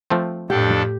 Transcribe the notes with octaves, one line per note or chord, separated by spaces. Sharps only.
F3 A3 C4
F2 A2 D4 G4 A4